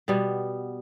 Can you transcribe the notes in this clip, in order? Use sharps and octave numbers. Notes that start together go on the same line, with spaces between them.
B2 G3 B3